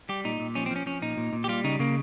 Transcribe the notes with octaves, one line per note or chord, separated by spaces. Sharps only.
G3 G4
A#2 D#4
A#2
F3 C#4
C4
F3 C#4
F3 C#4
A#2 D#4
A#2
A#2
G4
G3 F4
C#3 D#4
C#3 A#3